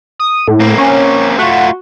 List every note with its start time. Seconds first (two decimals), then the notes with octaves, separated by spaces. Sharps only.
0.19 D#6
0.48 A2
0.60 A#3 C4
0.78 C#4
1.38 A3 F4 F#4